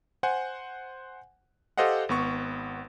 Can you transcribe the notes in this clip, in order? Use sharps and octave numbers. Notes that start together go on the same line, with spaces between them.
C5 F#5 G#5
G4 A4 C5 D#5 F5 F#5
G#1 B3 C#6